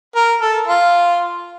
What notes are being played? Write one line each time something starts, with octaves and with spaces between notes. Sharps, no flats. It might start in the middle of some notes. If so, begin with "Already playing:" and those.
A#4
A4
F4